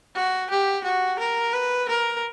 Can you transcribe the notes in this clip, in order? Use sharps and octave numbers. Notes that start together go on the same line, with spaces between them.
F#4
G4
F#4
A#4
B4
A#4